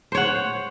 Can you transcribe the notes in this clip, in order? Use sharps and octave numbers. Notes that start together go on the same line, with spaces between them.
C5 C#5 F#5